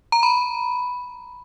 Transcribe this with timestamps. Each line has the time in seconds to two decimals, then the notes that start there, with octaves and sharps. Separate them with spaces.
0.12 A#5
0.23 B5